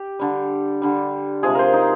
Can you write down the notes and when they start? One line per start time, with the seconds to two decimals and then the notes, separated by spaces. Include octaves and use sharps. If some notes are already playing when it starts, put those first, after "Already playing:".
Already playing: G4
0.19 D3 G3
0.82 D3 G3
1.43 C3 F3 G#3 G#4
1.55 A#4 C5
1.73 D#4